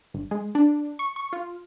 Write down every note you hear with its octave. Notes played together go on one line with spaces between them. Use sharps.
G1
G#3
D4
C#6
C#6
F4